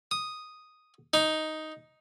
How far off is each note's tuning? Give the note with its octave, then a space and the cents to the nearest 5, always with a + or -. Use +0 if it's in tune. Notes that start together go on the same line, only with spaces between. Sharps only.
D#6 +0
D#4 +5